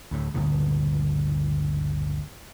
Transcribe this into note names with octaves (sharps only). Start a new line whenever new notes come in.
D2 A2
G1 D2 A#2 C#3